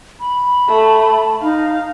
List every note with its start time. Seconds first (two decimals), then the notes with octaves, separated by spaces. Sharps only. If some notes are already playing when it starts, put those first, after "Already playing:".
0.20 B5
0.68 A3
1.41 D#4 F5